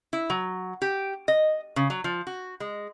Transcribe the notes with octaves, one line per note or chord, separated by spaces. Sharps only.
E4
F#3
G4
D#5
C#3
F#3
F3
F#4
G#3